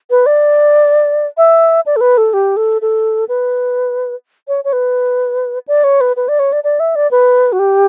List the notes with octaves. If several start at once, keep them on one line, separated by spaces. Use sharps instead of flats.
B4
D5
E5
D5
A4
B4
A4
G4
A4
A4
B4
C#5
C#5
B4
D5
C#5
B4
B4
D5
C#5
D5
D5
E5
D5
B4
F#4
G4